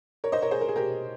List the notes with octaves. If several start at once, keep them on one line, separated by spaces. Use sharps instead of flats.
A#4 C#5
C5 D#5
A#4 C#5
G#4 C5
A#4
G#4
G4 A#4